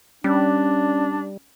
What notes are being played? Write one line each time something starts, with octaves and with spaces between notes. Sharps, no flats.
G3 C#4 D4